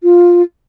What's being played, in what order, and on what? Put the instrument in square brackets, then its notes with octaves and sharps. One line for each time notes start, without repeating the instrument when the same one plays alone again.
[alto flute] F4